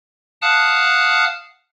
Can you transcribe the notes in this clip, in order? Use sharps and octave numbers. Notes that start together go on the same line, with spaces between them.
F5 F#5 A5 D#6 F6 F#6